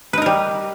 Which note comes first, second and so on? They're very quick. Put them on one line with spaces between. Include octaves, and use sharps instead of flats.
B4 D#4 A#4 G3